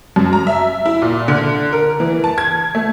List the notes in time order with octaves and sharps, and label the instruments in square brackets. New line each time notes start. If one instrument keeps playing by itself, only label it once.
[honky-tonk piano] F#2
A#5
E5
E4
A#2
D3
A#4
E3
A5
G#6
A3